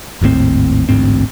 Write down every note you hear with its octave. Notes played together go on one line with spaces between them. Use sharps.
G#1 D#2 A2 C4
A1 D2 G#2 C4